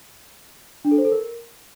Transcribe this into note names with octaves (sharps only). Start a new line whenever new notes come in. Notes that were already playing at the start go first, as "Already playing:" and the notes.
D4
A4
C5
A4
A#4